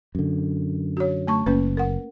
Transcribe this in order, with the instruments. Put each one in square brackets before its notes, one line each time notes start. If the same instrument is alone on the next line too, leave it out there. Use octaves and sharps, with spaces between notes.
[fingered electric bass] F#2 D3
[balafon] F#4 C#5
A3 A5 C#6
[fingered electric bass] F#1 [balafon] A#3 C#4 B4
[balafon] A#4 F#5